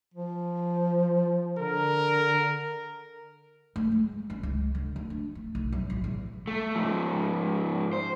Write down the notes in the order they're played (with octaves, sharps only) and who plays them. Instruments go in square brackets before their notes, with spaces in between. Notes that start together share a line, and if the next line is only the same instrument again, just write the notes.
[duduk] F3
[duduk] D3 [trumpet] A#4
[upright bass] A3
G#3
C#4
C#2
D3
D2
D4
A3
B1
F#2
A1
E2
[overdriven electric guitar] A3
G#2 F3
C5